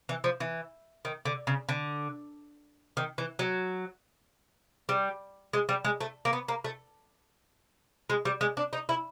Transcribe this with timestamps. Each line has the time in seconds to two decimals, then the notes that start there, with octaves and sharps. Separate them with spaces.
0.09 E3
0.24 F3
0.40 E3
1.05 D#3
1.25 D3
1.47 C#3
1.69 D3
2.97 D#3
3.18 E3
3.39 F#3
4.89 G3
5.53 G#3
5.69 G3
5.85 G#3
6.01 A3
6.25 A#3
6.33 B3
6.48 A#3
6.64 A3
8.10 G#3
8.25 G3
8.41 G#3
8.57 D4
8.73 D#4
8.89 E4